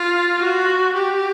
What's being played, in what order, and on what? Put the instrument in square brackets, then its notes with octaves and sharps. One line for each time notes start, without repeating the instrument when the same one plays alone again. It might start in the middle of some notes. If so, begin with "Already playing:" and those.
Already playing: [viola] F4
F#4
G4